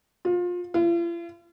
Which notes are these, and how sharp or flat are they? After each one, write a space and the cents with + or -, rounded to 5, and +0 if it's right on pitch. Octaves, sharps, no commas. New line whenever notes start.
F4 +25
F4 -45